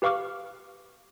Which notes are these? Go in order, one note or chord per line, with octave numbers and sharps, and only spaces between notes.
G4 B4 F5 C#6 D6 F6